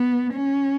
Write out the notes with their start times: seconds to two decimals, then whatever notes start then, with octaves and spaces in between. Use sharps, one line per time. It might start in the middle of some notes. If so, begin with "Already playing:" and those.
Already playing: B3
0.33 C#4